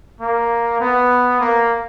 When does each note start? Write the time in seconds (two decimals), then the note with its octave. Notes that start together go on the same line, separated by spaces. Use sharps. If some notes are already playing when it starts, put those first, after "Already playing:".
0.21 A#3
0.80 B3
1.40 A#3